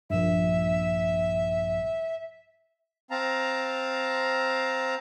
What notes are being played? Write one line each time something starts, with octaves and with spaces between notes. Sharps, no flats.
A#1 G2 E5
C4 F5 A5 A#5